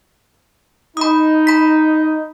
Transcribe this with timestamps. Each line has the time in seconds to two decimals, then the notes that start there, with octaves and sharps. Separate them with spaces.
0.97 D#4 B5 D#6
1.47 B5 B6